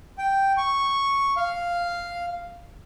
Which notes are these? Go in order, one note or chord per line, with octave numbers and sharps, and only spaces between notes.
G5
C#6
F5